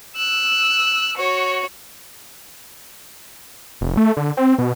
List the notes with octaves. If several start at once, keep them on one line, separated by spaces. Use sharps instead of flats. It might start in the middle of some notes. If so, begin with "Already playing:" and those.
E6 F#6
F#4 C#5
F1
A3
D3
C4
B2